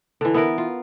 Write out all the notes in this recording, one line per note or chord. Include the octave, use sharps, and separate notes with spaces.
D3 E3
B3 E4 A#4
F4